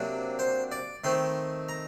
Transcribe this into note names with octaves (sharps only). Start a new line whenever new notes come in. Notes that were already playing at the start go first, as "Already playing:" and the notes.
Already playing: C3 F#3 A#3 D4
C5
D5
D#3 A3 C4 C6
A#5